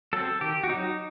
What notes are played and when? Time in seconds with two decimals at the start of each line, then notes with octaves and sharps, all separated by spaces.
0.13 F#3 C4 A4
0.41 D#3 G4
0.64 F#4
0.69 F#3 C4 D#4